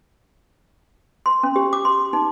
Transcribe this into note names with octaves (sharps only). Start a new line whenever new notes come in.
C6
C#4
G4
D6
C6
D#4